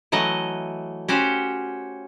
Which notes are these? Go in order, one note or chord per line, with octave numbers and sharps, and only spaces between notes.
E3 F#3 A3 D#5
C#4 F#4 G4 C5